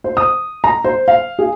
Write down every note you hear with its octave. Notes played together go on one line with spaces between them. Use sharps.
C5
D#6
A#5
C5
F5
G#4